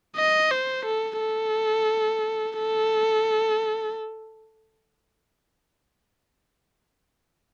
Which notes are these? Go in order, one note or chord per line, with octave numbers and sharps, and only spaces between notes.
D#5
C5
A4
A4
A4